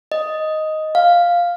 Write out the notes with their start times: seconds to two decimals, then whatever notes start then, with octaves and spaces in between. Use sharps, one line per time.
0.12 D#5
0.95 F5